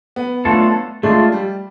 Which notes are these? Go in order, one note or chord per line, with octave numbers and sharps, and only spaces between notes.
B3
F#3 A3 D4 F4 A4
G#3 A3 D4 F4
G3